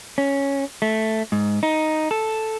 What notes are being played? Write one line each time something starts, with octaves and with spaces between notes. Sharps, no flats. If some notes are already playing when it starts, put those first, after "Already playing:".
C#4
A3
G#2
D#4
A4